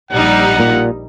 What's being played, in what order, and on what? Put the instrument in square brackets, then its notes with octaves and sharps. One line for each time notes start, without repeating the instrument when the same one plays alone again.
[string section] A#1 G3 D#4 [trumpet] F#5
[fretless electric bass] A#2